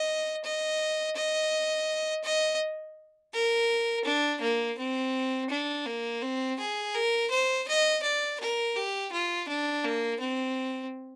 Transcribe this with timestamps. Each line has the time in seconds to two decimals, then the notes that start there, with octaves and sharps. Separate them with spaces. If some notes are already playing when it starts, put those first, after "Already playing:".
Already playing: D#5
0.44 D#5
1.16 D#5
2.24 D#5
3.33 A#4
4.05 D4
4.41 A#3
4.78 C4
5.50 D4
5.86 A#3
6.22 C4
6.59 G#4
6.94 A#4
7.31 C5
7.68 D#5
8.03 D5
8.40 A#4
8.76 G4
9.12 F4
9.48 D4
9.84 A#3
10.20 C4